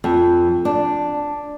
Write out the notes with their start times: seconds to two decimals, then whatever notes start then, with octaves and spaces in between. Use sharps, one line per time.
0.04 F2
0.65 D4